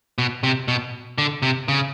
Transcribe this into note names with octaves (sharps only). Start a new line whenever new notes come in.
B2
C3
B2
D3
C3
C#3